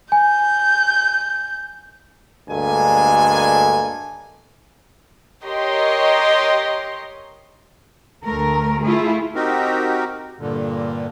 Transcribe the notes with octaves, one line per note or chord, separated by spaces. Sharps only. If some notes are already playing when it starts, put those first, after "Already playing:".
G#5 G6
D2 G2 G#3 A#3 A4 G#5
G4 A#4 C#5 D#5 C6
D2 A3 A#4
A3 E4 F4 G#4
C4 D#4 F#4 G4 A#4
G2 A#2 D3